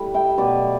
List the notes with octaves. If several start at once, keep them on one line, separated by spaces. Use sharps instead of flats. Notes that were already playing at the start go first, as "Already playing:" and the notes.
Already playing: A2 G3 B5
E5 G5
B2 F#3 A3 B4 D5